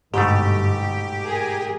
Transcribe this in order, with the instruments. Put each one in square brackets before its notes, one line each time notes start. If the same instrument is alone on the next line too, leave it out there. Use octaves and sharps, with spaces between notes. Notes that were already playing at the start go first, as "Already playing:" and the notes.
[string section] G1 [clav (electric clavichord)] G#2 B2 A3 [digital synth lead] G4
[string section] G#4 A#4